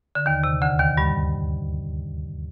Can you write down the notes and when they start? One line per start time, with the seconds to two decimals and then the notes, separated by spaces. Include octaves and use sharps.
0.15 D3
0.26 D#2 D#3
0.44 C3
0.62 D2 D3
0.79 D#2 D#3
0.97 G2 G3